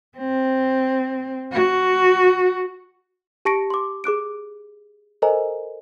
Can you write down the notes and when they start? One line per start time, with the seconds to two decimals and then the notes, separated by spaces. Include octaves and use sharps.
0.18 C4
1.52 F#4
3.45 G4 A5 C#6 A#6 C#7 D7
3.70 C6 D6
4.04 G#4 D6 F#6 D7
5.22 A4 A#4 C5 D#5 G#5 A#5